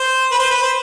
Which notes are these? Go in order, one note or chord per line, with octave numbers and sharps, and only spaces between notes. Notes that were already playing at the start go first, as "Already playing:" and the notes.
Already playing: C5
B4
C5
B4
C5